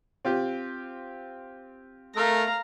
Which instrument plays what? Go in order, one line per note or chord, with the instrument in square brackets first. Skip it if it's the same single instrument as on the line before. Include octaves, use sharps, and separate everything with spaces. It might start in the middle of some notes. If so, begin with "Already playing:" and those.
[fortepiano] C4 F4 G4
[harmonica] A3 A#4 [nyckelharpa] F5 A#5